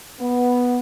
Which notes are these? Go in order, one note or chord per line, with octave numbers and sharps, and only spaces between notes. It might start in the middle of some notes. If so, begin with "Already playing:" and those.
B3